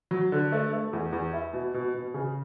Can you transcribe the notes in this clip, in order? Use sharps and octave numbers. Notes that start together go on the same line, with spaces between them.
F#3
D3
A3
A3
E2
E2
E4
B2
B2
B2
C#3